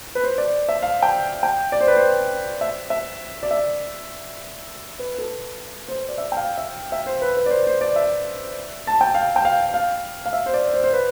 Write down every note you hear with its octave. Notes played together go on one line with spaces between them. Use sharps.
B4
C5
D5
E5
F5
G5
G5
D5
C5
B4
C5
E5
E5
D5
E5
B4
A4
C5
D5
E5
G5
F5
E5
E5
C5
B4
B4
D5
C5
C5
D5
E5
A5
G5
F5
G5
F5
F5
F5
E5
C5
D5
C5
C5
B4